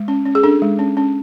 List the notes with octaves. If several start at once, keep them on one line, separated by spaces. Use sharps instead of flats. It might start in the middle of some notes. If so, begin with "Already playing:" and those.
Already playing: G#3
C#4
C#4
G#4
D4 A4
G#3
C#4
C#4